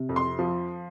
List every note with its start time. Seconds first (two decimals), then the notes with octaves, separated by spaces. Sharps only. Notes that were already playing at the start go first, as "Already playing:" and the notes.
Already playing: C3
0.09 F2
0.16 C6
0.39 F3